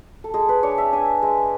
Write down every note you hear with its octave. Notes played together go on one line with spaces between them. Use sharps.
A4
G#3 G#4
B4
D4 C#5
E5
D4 G#5
G#3